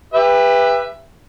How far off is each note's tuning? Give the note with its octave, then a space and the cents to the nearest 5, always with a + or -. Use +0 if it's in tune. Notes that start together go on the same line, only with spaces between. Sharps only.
G4 +35 B4 +0 E5 +15